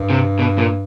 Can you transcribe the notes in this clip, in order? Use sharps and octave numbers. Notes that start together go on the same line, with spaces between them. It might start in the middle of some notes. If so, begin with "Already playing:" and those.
Already playing: G2
C3
B2
A#2